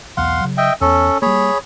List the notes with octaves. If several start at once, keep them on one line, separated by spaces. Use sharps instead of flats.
B1 E2 F5 F#5 C6
C#3 F#3
D#5 E5 G5
E2 B3 C#4 A4
G3 A#3 G#4 C#5 B5